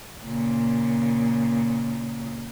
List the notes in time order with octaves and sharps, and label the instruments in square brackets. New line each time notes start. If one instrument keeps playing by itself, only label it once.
[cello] A#2 C#3